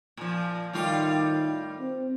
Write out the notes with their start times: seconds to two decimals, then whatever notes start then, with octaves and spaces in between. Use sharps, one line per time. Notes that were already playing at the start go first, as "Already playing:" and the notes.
0.17 A#2 F3
0.73 A2 D#3 G3 F4
1.80 C4